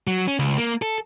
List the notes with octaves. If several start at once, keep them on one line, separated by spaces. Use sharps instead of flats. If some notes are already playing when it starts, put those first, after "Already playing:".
F#3
C#4
C#2
A#3
A4